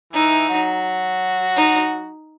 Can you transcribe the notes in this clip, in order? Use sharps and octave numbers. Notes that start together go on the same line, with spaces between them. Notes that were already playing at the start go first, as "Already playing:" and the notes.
E3 D#4 E4
F#3 F#4
D#4